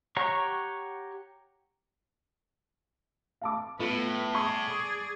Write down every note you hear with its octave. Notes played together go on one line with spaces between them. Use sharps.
G4 C#5 F#5 A#5 C#6
F5 A5 D6
A2 B3 F4 A4 B4
G#4 D5 C#6